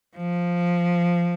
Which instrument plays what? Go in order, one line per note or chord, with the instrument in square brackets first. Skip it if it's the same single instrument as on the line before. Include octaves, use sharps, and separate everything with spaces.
[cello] F3